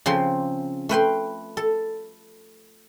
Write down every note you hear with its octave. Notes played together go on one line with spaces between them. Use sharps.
C#3 F3 C4 C6
A3 B4 G5 C6
A4